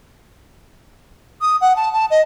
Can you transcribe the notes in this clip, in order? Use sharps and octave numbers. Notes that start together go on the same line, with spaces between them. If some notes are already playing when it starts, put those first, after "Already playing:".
D#6
F#5
A5
A5
D#5